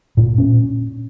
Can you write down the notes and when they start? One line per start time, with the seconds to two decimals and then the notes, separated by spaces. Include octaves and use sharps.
0.17 A#2
0.38 C#4